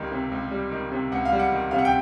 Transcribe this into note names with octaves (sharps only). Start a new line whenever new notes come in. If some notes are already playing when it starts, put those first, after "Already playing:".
Already playing: C#2 D#3 G3
C3
C#2
G3
D#3
C3
C#2 F#5
F5
G3
F#5
D#3
C3 F5
F#5
G5